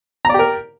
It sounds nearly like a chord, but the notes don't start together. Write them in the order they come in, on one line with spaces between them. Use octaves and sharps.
A#5 D5 G4 A#4